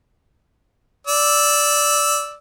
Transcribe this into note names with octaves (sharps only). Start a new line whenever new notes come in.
D5 E6